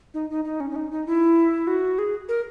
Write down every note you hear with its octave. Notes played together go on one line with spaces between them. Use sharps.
D#4
D#4
D#4
C#4
C#4
D#4
D#4
E4
F#4
G#4
A#4